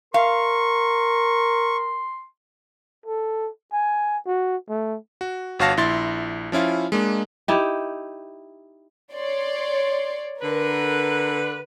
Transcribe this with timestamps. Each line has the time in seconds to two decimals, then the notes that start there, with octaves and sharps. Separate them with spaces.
0.14 A#4 F5 C6 C#6
3.06 A4
3.73 G#5
4.26 F#4
4.69 A3
5.21 F#4
5.59 G1 F#4 C#5 F5 A5 A#6
5.77 A#1 E4 C6 A6
6.52 F3 C#4 E4 F4
6.92 G#3 A#3 D4
7.48 D#4 E4 G4
9.13 C#5 D5 C6
10.42 D3 A#4 B4